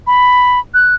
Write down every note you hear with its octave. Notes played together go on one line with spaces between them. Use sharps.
B5
F#6